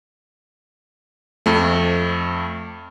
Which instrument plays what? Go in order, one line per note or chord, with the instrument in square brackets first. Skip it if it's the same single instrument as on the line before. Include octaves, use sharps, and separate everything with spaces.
[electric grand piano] F2 A3